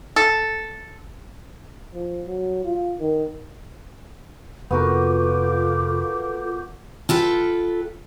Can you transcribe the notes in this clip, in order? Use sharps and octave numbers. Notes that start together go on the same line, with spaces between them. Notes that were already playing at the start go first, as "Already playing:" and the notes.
A4
F3
F#3
F4
D#3
F1 B3 F4 F#4 A4 A#4 D6 G6
F4 A4 B4 G5